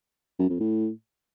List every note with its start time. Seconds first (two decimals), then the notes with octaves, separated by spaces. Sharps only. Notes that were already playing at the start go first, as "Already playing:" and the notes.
0.39 F#2
0.50 F2
0.60 A2